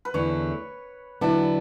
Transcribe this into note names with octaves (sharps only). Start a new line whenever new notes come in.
B4
E2 D3 A3 E4 C#5
E2 D3 F#3 B3 D4 E4